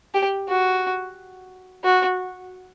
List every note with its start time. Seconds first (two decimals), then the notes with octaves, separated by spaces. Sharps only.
0.14 G4
0.48 F#4
1.84 F#4